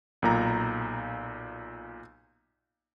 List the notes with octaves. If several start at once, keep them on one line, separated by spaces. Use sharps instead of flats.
B1 A#2 A#5